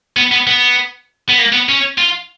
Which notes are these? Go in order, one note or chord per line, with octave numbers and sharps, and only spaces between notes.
B3
B3
B3
B3
A#3
B3
C#4
F4